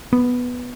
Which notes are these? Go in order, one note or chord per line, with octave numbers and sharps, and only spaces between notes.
B3